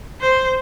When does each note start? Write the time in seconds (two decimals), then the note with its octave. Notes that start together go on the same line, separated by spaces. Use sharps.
0.21 C5